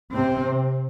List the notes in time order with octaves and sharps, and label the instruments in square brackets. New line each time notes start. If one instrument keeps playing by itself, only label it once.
[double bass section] C3 C4